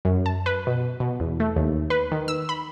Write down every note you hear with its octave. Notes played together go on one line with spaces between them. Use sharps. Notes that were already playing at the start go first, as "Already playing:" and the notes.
F#2
A5
B4
B2
B2
E2
A3
D#2
B4
D#3
E6
B5